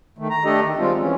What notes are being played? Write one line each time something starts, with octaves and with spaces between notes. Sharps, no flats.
D#3 A3
A#5
A3 D4 G4 A4 D#5
D#3
G3 G#3 C4 F4
E3 C#4